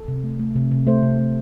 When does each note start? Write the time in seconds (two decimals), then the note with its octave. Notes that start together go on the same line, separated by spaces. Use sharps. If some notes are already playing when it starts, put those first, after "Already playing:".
Already playing: A4
0.08 C3
0.24 A3
0.39 A3
0.56 C3
0.71 C3
0.87 A3 C5
1.03 C3
1.18 A3